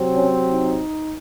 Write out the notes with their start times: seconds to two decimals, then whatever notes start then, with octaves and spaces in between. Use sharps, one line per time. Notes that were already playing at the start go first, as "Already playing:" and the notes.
Already playing: C3 F#3 C4
0.16 C#4
0.53 D#4